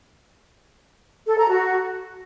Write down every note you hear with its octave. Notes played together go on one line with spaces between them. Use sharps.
A4
A#5
F#4